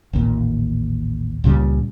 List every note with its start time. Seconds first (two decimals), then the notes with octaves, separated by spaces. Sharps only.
0.13 A1 D#2 A#2
1.44 C#2 A#2 C#3 G3